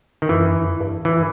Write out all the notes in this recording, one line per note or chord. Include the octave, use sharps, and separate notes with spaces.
D#3
F#2 E3
F2
G2
G#2 E3